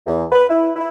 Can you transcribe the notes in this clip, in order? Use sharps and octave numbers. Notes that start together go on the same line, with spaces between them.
E2
B4
E4
E4